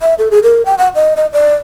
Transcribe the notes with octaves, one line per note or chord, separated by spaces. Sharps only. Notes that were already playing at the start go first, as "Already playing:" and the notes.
E5
A4
G#4
A#4
G5
F#5
D#5
D#5
D5